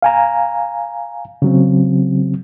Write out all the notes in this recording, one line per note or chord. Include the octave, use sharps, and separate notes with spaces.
F5 G#5 A#5
C#3 F#3 C4